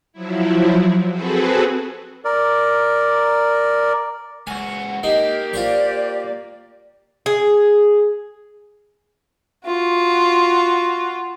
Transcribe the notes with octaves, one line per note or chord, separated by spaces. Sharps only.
F3 F#3 E4
C4 F#4 G#4 A4 B4
A#4 D5
C#2 F#4 G#5
A#3 D#4 G4
F4 C5 D5 C#6
G#4
F4 F#4